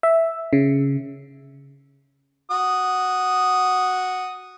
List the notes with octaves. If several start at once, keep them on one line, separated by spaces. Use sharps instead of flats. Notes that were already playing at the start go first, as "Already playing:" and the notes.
E5
C#3
F#4 D#6